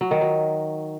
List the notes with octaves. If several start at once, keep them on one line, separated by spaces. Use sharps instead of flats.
F#3
D#3
F#3